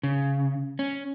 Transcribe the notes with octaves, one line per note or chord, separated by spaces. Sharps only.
C#3
C#4